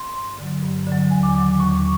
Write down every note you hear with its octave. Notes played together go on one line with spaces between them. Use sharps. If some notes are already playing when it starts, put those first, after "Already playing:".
Already playing: C6
G2
D3 F#3
G2
D3 F#3
D#2 G#5
D6
D#3 F#3 D6
D#2 C#6
C#6